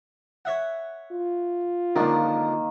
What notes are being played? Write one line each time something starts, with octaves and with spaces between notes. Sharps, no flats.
C#5 E5 F#5
F4
C#2 D3 D#3 F3 A#3